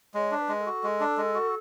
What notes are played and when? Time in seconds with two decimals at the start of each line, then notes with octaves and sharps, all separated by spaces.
0.14 G#3 C#5
0.32 D4
0.38 B4
0.49 G#3
0.60 A4
0.66 F#4
0.84 G#3
1.00 D4
1.17 G#3
1.34 F#4